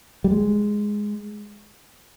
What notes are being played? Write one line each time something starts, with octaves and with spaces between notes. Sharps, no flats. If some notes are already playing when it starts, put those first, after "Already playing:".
G3
G#3